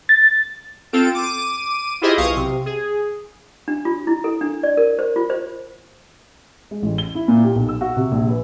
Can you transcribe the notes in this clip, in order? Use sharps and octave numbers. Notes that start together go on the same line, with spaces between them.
A6
C4 F4 A4 D7 E7
D6 D#7
E4 F4 G4 G#4 C5 D#5
B1 F5 C#6 D#6
C3
G#4
D4
F4
E4
A4
D4
D5
A#4
C5
F4
C5
G#3
A1
G7
E4
A#2
G4
B1
E6
F#4
C3
A#1
B4